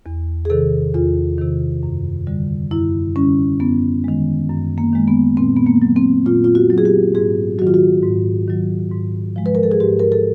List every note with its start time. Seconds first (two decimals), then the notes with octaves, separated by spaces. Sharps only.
0.06 E2
0.45 G#4
0.50 C3 D#3 A4
0.94 E2 F4
1.38 C3 D#3
1.83 F#2
2.27 D3 G3
2.71 F#2 E4
3.16 D3 G3 C#4
3.60 F#2 B3
4.04 D#3 G#3
4.49 F#2
4.78 A#3
4.93 D#3 G#3
5.08 B3
5.37 A#2 C4
5.57 B3
5.67 A#3
5.82 F#3
5.96 C4
6.26 A#2 F4
6.44 F4
6.55 F#4
6.70 F#3
6.78 G#4
6.85 G4
7.14 G#2 G#4
7.59 F#3 F#4
7.62 D#3
7.67 F4
7.74 F#4
8.03 G#2
8.48 D#3 F#3
8.91 G#2
9.36 F3 G#3
9.46 B4
9.55 A#4
9.63 A4
9.71 G#4
9.80 G#2 G4
9.99 A#4
10.12 A4